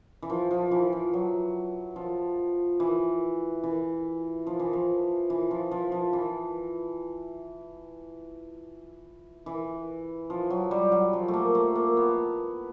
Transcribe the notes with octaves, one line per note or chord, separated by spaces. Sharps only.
E3
F3
F3
E3
F3
F#3
F3
E3
E3
F3
E3
F3
E3
F3
F3
F3
E3
E3
F3
F#3
G3
F#3
F3
A3
A#3
A3
A#3
B3